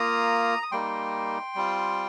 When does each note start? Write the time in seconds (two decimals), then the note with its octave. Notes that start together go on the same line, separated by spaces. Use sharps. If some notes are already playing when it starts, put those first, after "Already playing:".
Already playing: A#3 F4 A#5 D#6
0.63 D#6
0.72 G3 A#3 D#4 G5 C6
1.55 G3 C4 F4